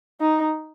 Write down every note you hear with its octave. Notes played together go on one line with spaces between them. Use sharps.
D#4